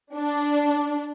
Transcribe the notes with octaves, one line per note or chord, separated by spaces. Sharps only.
D4